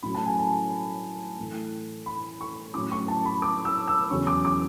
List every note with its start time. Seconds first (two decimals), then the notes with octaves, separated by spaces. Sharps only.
0.03 A2 F#3 C#4 B5
0.14 A5
0.26 G#5
0.38 A5
1.39 A2 E3 A3
2.06 B5
2.41 C#6
2.74 A2 F#3 C#4 D6
2.92 C#6
3.08 A5
3.25 B5
3.42 D6
3.65 E6
3.88 E6
4.10 E2 C#3 F#3 C#4 C#6
4.27 D6
4.45 D6